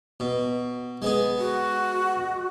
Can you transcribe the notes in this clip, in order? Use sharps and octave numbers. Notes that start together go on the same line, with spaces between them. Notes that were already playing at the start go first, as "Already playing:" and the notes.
B2
G#3 B3 G#4
F#4